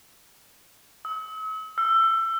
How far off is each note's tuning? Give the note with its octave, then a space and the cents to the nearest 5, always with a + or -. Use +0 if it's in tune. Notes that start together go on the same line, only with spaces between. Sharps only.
E6 -45
E6 +25